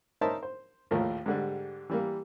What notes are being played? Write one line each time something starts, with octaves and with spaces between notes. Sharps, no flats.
D#4 A#4 C5 C#5 E5 A5
C5
A#1 D#2 A2 F3 A3 A#3
G#2 D3 G3
E3 G3 A#3